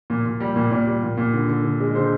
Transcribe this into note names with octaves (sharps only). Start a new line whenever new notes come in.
A#2
A#2
G3
A#2
A#2 D5
G3
A#2
A#2
D3
D3
D3
G#3
D3 C5